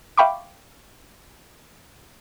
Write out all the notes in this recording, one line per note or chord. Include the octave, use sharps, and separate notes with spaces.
E5 F5 G5 B5 C#6 D6